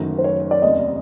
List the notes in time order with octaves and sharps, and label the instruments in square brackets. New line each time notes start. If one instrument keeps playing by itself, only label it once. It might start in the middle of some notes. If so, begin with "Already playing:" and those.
Already playing: [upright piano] F#1 F#2 D#3 F#3 A3
[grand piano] C5
C#5
D5
[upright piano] F1 D#2 C#3 [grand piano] D#5